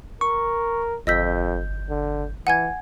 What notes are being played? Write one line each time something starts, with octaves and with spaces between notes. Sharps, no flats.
A#4 C#6
G1 F2 D#5 E6 G6 B6
D3
E3 F#5 G#5 G#6